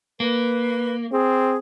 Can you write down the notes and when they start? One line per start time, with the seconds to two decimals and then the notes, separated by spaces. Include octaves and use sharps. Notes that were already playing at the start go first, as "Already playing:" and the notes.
0.20 A#3 B4
1.12 C4 G#4